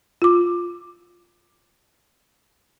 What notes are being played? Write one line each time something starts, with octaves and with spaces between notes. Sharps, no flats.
F4 D6